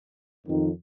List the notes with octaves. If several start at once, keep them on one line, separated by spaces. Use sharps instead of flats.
F2 D#3